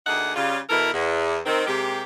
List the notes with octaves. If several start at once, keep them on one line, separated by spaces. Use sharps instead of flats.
D2 A3 A#3 D#4 G#4 F#5
C#3 G3 F4
B2 E3 E4 A4 A#4
E2
D#3 C4
C3 G#3 A#3 G4